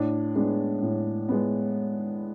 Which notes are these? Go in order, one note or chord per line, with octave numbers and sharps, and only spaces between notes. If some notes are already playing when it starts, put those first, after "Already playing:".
Already playing: A2 D4
G#3 B3 D4
A2
G#3 B3